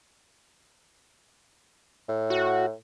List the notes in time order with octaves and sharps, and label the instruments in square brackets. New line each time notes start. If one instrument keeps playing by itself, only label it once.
[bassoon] A2
[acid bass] F#4